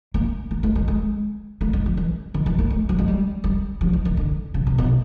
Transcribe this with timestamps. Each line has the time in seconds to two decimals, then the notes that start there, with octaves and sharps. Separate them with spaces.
0.14 A#3
0.51 A#3
0.63 A3
0.76 G#3
0.88 G#3
1.61 A3
1.73 G3
1.86 F3
1.97 E3
2.34 D#3
2.46 E3
2.58 A#3
2.70 A3
2.89 F#3
2.99 G#3
3.08 G3
3.44 G3
3.81 F3
3.93 E3
4.05 D#3
4.17 D3
4.54 C#3
4.67 C3
4.78 B2